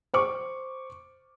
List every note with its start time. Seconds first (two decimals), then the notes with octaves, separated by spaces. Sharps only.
0.14 C5 C#6 D6